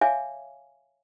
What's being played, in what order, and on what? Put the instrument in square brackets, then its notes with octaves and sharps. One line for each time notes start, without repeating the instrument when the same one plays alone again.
[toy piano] C#5 E5 F5 G#5 D6